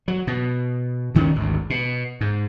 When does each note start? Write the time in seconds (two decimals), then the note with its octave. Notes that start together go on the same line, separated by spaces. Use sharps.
0.08 F#3
0.27 B2
1.15 D2 D#3 C4 C#4
1.36 G#1 D2
1.70 B2
2.21 G#2